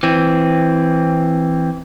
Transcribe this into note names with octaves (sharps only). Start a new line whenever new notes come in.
E3 C4